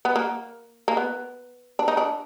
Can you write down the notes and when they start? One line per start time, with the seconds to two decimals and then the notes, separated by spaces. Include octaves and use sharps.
0.05 B3
0.16 A#3
0.88 A#3
0.97 B3
1.79 D4
1.88 D#4
1.97 D4